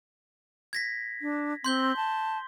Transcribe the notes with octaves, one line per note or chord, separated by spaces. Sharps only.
G#6 A#6 B6
D4
C4 C6 G6 G7
A5